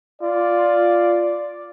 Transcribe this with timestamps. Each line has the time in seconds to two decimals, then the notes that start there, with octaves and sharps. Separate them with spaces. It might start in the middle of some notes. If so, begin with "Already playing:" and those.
0.22 F4 D5